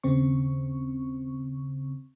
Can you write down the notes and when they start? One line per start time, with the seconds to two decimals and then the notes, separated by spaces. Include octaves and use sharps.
0.04 D#2 C#3 C4 C#6